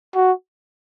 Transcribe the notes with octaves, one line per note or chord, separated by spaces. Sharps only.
F#4